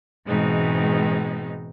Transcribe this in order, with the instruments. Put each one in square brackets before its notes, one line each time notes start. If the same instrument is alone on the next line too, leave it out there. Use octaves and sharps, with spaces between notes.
[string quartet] G#2 B2 E3 G#3 C4 D#4